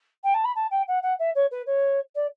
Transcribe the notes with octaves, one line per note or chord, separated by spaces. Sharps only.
G5
A5
B5
A5
G5
F#5
F#5
E5
C#5
B4
C#5
D5